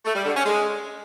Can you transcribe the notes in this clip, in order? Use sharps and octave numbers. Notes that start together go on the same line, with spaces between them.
A3
G3
D3
C#4
G#3